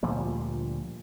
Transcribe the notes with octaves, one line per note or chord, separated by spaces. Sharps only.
D2 A#2 F3 G3